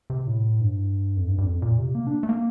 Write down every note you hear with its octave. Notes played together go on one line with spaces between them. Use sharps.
C3
A2
G2
F2
G2
G2
F2
A#2
C3
A#3
D4
A3
A#3